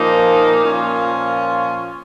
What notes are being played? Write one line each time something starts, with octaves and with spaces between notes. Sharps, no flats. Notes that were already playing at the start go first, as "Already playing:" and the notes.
Already playing: A#2 F3 A#3 D#4
A#2 F3 C#4 F4